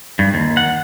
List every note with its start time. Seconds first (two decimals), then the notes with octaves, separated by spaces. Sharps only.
0.19 G2
0.34 D#2
0.57 F#5